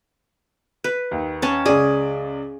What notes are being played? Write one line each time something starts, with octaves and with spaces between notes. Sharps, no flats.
B4
D#2
C#4 A5
C#2 G#4 D5